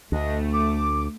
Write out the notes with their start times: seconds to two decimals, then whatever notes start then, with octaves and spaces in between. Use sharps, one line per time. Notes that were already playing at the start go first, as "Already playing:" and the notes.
0.12 D2 A3 D4 D#5
0.52 D6